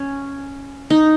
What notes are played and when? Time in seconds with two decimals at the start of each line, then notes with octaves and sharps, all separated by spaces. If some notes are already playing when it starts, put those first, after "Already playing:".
Already playing: C#4
0.90 D#4